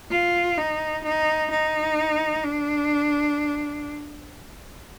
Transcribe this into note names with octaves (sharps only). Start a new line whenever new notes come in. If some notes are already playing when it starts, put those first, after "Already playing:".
F4
D#4
D#4
D#4
D4